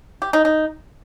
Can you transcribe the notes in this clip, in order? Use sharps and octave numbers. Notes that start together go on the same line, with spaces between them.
G4
D#4
D#4